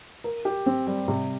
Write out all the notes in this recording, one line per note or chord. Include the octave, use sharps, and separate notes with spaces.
A#4
G4
C4
G3
C3